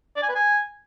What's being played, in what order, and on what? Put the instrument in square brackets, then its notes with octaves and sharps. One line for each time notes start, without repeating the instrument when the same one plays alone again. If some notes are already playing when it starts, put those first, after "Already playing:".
[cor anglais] D5
G#5
B4
G#5